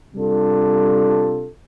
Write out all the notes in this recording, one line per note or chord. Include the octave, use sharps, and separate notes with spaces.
C3 G3 D4 F4 A4